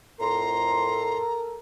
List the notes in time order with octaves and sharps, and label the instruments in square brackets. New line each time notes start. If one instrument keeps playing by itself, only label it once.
[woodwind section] F2 A2 C6 [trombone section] A4 A#4 [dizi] A#5